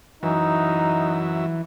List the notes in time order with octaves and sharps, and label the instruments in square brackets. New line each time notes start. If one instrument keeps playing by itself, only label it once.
[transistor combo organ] F#2 F#3 E5 [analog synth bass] E3 [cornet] D#4